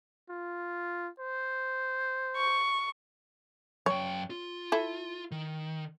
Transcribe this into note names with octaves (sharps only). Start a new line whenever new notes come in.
F4
C5
C#6
F#2 C#5 G5
F4
E4 A4
D#3